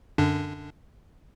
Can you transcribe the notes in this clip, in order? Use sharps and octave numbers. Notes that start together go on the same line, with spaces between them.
F#2 D3 D4